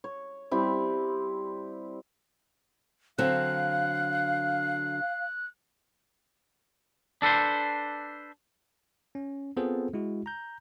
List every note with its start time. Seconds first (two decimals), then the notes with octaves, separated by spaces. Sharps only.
0.04 C#5
0.51 G3 C4 E4
3.18 D3 F#3 C4 F5 F#6
7.22 D4 A4 B4 C5
9.15 C#4
9.57 B3 C4 F4 G#4 A4 C5
9.93 G#3 E4 F#4
10.26 A#5 G6